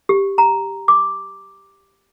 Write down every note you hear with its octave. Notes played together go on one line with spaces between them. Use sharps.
G4
A#5
D6